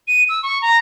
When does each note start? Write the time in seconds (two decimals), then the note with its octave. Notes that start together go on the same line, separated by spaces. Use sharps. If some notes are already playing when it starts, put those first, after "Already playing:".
0.08 D#7
0.29 E6
0.43 C#6
0.62 A#5